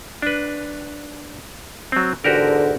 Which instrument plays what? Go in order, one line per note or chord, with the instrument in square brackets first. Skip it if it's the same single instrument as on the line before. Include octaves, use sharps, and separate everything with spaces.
[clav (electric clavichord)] D4 B4
F#3 C4
[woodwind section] E2 G#2 D3 [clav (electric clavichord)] F#4 G4 A#4